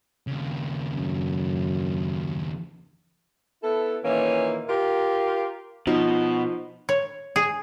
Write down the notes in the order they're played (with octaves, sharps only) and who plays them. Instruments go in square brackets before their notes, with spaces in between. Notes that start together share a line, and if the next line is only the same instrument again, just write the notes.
[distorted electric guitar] D#2 C#3
[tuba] F#2
[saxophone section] B3 E4 A4
A#2 D#3 E3 A#3 C#4
F4 G4 A#4
[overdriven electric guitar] B2 [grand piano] F3 [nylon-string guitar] D#4
[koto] C#5
G#4